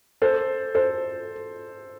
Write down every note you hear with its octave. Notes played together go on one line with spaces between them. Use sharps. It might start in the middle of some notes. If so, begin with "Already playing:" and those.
A4 C5
A4 C5